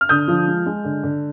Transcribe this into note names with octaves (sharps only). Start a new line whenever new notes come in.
F6
D3 D#6 G6
F3
G#3
G#3
D3
D3